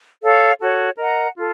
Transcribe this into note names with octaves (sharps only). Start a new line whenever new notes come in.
A4 C#5 F5
F#4 A4 C#5
A#4 D#5 F#5 A#5
F4 A4